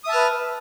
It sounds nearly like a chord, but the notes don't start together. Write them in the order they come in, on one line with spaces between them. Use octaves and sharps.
D#6 E5 A5 F6 B4